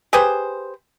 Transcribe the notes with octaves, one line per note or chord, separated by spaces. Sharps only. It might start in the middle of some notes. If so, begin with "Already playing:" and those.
G4 G#4 B4 C5